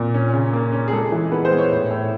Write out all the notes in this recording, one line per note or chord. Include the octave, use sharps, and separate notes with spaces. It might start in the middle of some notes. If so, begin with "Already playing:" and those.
Already playing: A#2
C#4
C#3
A#3
C#4
G#4
G#3 A4
E3
B3 B4
C5
G#3
C#5
A2
A2